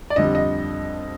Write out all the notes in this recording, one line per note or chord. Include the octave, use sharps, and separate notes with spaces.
D5
F2 D3 G3 D#5
D#5